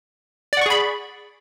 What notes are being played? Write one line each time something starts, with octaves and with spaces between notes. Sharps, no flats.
G#4 D5 F#5 B5 C#6